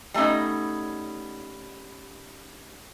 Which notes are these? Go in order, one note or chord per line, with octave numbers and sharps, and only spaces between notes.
G3 A3 B3 C#4 D#4